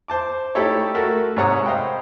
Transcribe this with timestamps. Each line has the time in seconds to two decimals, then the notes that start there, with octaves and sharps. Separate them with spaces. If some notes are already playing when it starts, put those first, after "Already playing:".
0.08 C5 A5 D6
0.55 A3 D#4 E4 G4 A4 C#5
0.94 A3 F#4 A4 A#4
1.36 G#2 C3 C#5 F#5 A#5 D#6
1.65 C5 D#5 F5 G5 B5